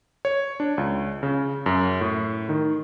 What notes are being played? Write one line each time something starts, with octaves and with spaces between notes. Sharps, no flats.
C#5
D4
C#2
C#3
F#2
A2
D#3